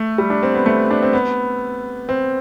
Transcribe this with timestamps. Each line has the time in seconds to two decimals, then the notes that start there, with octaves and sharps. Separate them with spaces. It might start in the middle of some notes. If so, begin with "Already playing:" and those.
Already playing: A3
0.18 G3
0.30 D4
0.43 C4
0.54 B3
0.66 A3
0.91 D4
1.03 C4
1.13 B3
2.09 C4